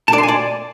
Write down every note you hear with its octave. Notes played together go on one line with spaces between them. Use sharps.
A5
D5
C6
G#5
D5